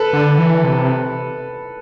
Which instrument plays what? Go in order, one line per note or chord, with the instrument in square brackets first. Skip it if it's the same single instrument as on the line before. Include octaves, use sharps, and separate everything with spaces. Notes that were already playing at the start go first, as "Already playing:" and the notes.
Already playing: [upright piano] A4 B4
[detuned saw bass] D3
E3
C3